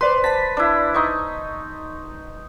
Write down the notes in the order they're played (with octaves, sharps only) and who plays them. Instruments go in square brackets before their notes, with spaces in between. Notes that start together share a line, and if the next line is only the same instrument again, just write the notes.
[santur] B4 [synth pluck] C5 D5 C6
[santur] A5 [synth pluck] B6
[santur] D4 E4
D#4 C6 C#6